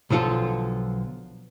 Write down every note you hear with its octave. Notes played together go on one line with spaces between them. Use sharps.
B1 D3 F3 F4 A4